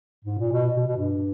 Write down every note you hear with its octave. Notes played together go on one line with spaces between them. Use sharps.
G#2
A#2
B2
B2
B2
G2